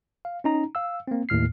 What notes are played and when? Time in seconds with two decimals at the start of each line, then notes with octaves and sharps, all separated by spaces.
0.25 F5
0.44 C#4 D#4 A#5
0.75 F5 E6
1.08 A#3 C4
1.29 D#2 A2 F6 C7